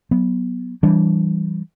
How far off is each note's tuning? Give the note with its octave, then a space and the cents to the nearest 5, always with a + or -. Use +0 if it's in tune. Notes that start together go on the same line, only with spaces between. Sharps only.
F#3 +0 B3 -10
E3 +0 G3 -15 D4 +0